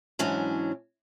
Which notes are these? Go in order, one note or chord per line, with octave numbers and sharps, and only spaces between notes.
G#2 E3 F#3 C#4 D4